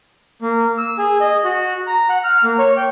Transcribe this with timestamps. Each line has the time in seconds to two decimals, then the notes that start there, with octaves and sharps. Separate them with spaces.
0.42 A#3
0.78 E6
0.98 G#4
1.21 D#5
1.44 F#4
1.87 A#5
2.09 F#5
2.24 F6
2.44 A#3
2.59 C#5
2.77 G5